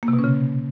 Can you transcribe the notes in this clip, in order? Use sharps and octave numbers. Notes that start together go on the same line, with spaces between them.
A#3
C3
B2
C#4
C#3